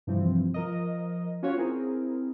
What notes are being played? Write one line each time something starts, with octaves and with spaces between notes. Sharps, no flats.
G2 C3 E3 F3 C4
F3 A#4 D#5
C#4 F4 F#4 C#5
C4 E4 G#4 A#4